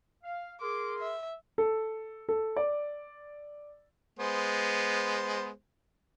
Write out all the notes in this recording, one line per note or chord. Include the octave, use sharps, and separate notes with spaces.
F5
G#4 A#4 C6 D6
E5
A4
A4
D5
G#3 B3 C5